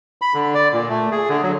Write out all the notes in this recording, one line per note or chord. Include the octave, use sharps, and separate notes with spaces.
B5
D3
D5
A#2
A3
G#4
D3
F#3